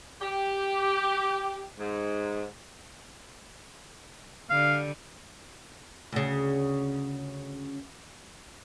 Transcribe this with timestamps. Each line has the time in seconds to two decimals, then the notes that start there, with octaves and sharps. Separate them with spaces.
0.21 G4
1.77 G#2
4.50 D3 G3 F5
6.12 D2 C#3